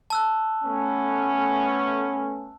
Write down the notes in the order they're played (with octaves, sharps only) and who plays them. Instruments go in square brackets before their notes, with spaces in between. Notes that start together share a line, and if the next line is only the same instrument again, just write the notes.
[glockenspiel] A5 E6 F#6
[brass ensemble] A3 B3 C#4